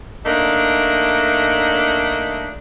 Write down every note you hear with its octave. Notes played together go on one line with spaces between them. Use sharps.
A3 A#3 D4 D#4